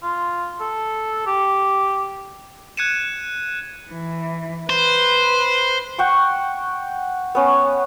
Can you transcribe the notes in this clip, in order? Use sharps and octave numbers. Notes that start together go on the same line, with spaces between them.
F4
A4
G4
F#6 G#6 C#7 D#7 E7
E3
B4 C5
F#5 G5 C#6
B3 C#4